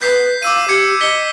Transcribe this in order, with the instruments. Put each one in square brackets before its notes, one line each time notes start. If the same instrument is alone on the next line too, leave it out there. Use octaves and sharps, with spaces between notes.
[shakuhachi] B4 [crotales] G6 B6 C7
[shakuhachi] F5 [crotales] D6 E6 D#7
[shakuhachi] G4 [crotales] D6 G#6 C#7
[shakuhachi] D#5 [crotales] B6 C#7 G7